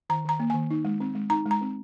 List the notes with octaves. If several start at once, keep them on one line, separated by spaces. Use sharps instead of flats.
D#3 A#5
D#3 A#5
A#3
D#3 G#5
D#4
G#3
C4
G#3
D#4 A#5
G#3 A#5
C4